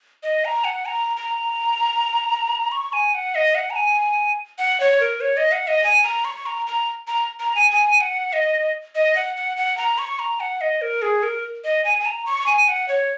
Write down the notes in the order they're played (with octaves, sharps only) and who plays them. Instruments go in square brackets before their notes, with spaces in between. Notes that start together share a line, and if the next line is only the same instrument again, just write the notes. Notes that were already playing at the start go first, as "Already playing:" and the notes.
[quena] D#5
A#5
F#5
A#5
A#5
C#6
G#5
F#5
D#5
F#5
A#5
G#5
F#5
C#5
A#4
C#5
D#5
F#5
D#5
G#5
A#5
C#6
A#5
A#5
A#5
A#5
G#5
G#5
F#5
D#5
D#5
F#5
F#5
F#5
A#5
C#6
A#5
F#5
D#5
A#4
G#4
A#4
D#5
G#5
G#5
A#5
C#6
G#5
F#5
C#5